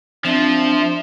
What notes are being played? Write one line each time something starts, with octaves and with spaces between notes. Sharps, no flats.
F3 C4 D4 E5